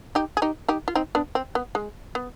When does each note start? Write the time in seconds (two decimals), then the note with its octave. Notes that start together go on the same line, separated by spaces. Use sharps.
0.15 D#4 G4
0.37 G#4
0.42 D#4 G4
0.69 D#4 G4
0.88 F4
0.95 C4 D#4
1.15 B3 D4
1.35 C4
1.55 B3
1.75 G#3
2.15 B3